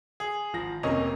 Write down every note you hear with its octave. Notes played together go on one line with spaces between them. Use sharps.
G#4
G#1 F3 A#6
F1 C3 A#3 C#4 D#5